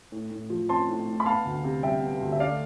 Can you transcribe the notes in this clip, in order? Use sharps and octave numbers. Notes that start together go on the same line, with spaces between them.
A2
A2
F3
C4 A5 C6
A2
A2
B5
B3 F5 A5
D2
C3
G3 E5 G5
B3
D2
E5
A3 D5 F5